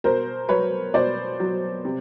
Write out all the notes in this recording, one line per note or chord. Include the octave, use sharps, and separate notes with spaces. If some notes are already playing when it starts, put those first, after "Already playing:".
B2 A#4 C5
F#3 B4 C#5
B2 C5 D5
F#3
C3